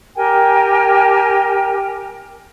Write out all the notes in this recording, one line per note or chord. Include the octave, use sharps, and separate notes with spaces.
G4 A#4 G5 G#5